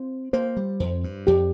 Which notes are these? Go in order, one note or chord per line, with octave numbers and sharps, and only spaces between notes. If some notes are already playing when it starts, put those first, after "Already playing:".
Already playing: C4 C5
A#3 C5
G3
F2 C5
G2
F2 G4